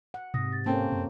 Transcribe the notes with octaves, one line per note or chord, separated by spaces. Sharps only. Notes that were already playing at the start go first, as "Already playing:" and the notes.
F#5
G#2 C3 D#6 A#6
A6
A#3 C4 C#4 A4 G5 A5
F#2